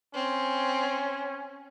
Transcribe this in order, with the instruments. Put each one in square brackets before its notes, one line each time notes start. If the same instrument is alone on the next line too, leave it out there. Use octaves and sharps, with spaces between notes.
[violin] C4 [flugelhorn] C#4